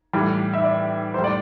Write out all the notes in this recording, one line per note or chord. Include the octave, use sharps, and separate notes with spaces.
A2 E3 G3
E5
D5
A2 G3 C5
D5